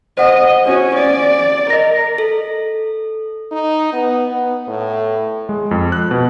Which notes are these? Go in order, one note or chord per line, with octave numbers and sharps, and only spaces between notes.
C5 D#5 F#5
C#4 F#4
D5
A#4 D#5 A#6
A4
D#4
B3
B3
A2
G#3
F2
F#6
B2